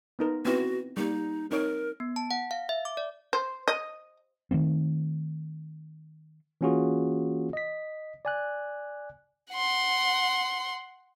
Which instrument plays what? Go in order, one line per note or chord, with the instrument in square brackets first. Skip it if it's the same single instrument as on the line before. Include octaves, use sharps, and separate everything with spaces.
[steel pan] B3 D#4 A#4
[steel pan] B3 C4 E4 [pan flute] F#4
[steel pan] G3 A#3 [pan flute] D#4
[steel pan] C4 D#4 C#5 [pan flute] A#4
[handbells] B3
A5
F#5
F5
E5
D6
D5
[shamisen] C5
D#5
[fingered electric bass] D#3 F3 A3 C4
[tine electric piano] E3 A#3 C#4 F4 F#4 G#4
D#5 B6
D5 G#5 F#6
[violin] F#5 C6